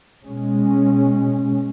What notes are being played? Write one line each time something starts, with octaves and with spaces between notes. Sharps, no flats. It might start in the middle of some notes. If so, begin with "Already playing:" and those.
B2 G#3 C#4